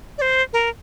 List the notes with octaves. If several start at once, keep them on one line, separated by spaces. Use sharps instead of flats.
D5
C5
A#4